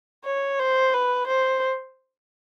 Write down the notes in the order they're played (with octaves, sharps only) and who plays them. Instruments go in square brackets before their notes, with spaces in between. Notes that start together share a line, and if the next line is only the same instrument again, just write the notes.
[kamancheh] C#5
C5
B4
C5